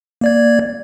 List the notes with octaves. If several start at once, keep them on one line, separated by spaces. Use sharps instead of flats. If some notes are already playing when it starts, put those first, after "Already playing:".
A#3 D5 G#6